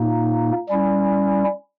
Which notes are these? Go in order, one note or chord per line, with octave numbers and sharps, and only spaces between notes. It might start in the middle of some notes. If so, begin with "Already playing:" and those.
Already playing: A#2 A#3 D#4
G3 C#4 E4